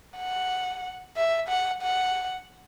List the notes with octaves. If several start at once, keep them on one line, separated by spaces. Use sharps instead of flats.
F#5
E5
F#5
F#5